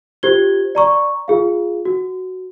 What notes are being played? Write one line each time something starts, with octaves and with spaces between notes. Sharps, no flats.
F4 G4 C5 G#6 G7
D5 A#5 C#6
F4 G#4 F5
F#4